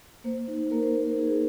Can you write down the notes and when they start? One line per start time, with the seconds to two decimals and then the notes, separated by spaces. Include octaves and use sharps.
0.24 A#3 C5
0.48 D#4
0.71 A#3 A#4
0.83 C5
0.94 A#3 C5
1.07 A#4
1.18 D#4 G#4